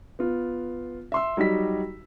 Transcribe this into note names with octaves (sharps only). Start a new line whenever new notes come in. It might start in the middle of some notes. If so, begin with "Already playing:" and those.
B3 F4
E5 C6 E6
F#3 G3 D#4 G4 B6